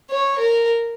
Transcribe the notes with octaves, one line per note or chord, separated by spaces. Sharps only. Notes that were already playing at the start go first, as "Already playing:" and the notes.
C#5
A#4